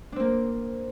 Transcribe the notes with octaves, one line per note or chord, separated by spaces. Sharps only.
A#3 C4 D4